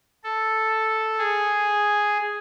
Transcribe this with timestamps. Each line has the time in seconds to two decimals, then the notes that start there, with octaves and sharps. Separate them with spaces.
0.24 A4
1.18 G#4